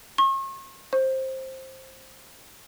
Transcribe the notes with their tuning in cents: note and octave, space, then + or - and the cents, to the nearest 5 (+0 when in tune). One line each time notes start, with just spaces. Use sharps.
C#6 -45
C5 +15